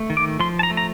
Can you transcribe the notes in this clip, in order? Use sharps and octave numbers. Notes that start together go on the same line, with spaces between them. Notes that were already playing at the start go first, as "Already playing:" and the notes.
Already playing: A3
D#3
D6
F3 C6
A5
A#5
A3
A#5